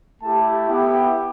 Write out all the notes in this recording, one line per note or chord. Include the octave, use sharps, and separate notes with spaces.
A3 E4 G4 A5
B3 E4 G4